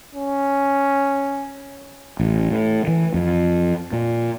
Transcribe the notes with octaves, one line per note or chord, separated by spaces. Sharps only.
C#4
A1
A2
E3
F2
A#2